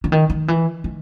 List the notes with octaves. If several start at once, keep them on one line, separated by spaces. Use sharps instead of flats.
D3
D#3
D#3
E3
D#3